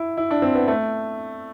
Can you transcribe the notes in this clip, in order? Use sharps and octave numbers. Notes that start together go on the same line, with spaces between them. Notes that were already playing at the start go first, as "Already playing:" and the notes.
Already playing: E4
E4
D4
C4
B3
A3